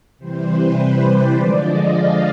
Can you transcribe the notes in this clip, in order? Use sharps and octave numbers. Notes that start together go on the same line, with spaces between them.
C3 E3 G3 C5
B4
C5
D5
D3 F3 G#3
D#5
F5